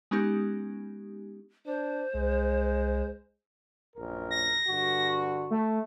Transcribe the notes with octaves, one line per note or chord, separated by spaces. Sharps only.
G#3 B3 C#4 D#4 G4
D4 C5
C2 G#3
A#1 F#2 A#4
A#6
G2 D3 F#4
A3